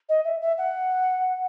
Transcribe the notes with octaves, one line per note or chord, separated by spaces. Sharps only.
D#5
E5
E5
F#5